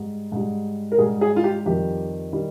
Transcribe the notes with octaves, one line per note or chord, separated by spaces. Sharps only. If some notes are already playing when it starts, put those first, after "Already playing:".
Already playing: G#2 G3
G#2 G3
A#4
G#2 G3 G#4
G#4
F4
G4
F2 D#3 G3 G4
D#3 G3